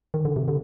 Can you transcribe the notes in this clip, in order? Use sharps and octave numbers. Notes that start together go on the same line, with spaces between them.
D#3
D3
C3
D3